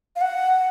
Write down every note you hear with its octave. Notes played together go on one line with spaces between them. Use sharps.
F5
F#5